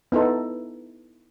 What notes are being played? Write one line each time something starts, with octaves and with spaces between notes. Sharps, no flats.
B3 D#4 E4 A4